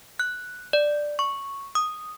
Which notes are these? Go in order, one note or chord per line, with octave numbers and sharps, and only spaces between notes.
F#6
D5
C#6
D#6